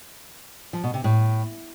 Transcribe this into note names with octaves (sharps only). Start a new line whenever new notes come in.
F3
B2
C3
A2